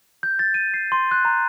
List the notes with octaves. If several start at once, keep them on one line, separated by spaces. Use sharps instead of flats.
G6
A6
D#7
C7
C6
F#6
A#5